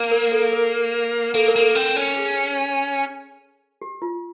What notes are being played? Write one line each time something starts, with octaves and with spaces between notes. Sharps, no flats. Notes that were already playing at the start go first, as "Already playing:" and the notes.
Already playing: A#3
A#4
A4
A#4
A#3 A4
A#4
A#3 A4
C4
C#4
G#4
G4
F4